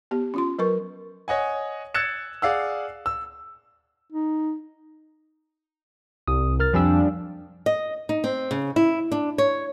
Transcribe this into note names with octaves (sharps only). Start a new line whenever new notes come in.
B3 G4
C#4 F4 C6
F#3 A#4 B4 C#6
C#5 D#5 F#5 G#5
E6 F#6 G#6 A6 C#7 E7
G#4 D5 F5 F#5 E6
E6
D#4
C2 D#6
A#4 F6 A6
F2 F3 G3 D4 G#5 E6
D#5
D#4
C4
C#3
E4
D4
C#5